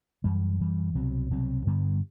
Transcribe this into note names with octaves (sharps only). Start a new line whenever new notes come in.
F#2 E3 G3
F#2 E3 G3
C2 B2 F#3 C4
C2 B2 F#3 C4
G2 D3 G3 B3